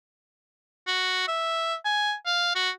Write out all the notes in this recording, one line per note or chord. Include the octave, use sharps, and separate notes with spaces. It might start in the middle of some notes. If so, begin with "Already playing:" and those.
F#4
E5
G#5
F5
F#4